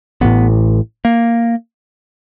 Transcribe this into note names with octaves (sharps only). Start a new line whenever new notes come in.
A1 A2 B3
A#3